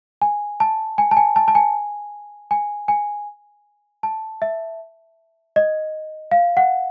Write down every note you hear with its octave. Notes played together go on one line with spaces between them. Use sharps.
G#5
A5
G#5
A5
G#5
A5
A5
G#5
G#5
G#5
A5
E5
D#5
F5
F#5